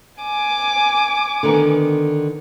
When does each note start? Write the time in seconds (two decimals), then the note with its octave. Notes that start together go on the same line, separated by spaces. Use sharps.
0.22 G#5 D6
1.43 D3 D#3 B3